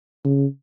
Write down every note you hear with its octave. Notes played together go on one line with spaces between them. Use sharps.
C#3